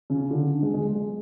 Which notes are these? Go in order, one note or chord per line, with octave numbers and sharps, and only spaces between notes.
C#3
D3
G#3
G#3
G#3